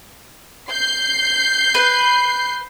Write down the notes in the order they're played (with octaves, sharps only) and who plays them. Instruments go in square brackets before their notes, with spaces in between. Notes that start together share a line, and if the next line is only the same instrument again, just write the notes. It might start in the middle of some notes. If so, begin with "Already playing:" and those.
[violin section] G6 C7
[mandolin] B4